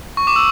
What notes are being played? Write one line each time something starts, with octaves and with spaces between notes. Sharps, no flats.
C#6
D6
E6